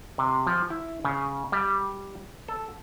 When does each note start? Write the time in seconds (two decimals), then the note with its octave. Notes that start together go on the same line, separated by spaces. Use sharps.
0.18 C3
0.47 F3
0.70 E4
1.05 C#3
1.52 G3
2.48 A4